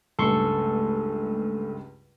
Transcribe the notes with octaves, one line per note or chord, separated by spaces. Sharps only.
C#2 G2 G#3 A3 A4 C6 C#6